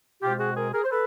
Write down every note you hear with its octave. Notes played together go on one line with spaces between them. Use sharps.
B2 G#3 C4 F4 G4
F#4 G#4
G#4 A#4
G#4 A#4
C5
A4 B4